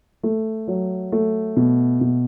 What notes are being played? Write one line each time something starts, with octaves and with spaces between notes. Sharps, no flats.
A3
F#3
A3
B2
B2